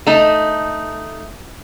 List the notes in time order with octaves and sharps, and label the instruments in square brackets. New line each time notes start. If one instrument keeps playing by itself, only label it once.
[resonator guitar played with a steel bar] A3 D#4